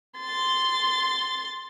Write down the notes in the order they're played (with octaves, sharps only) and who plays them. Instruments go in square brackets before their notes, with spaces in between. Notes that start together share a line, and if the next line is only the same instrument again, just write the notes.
[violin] C6 A6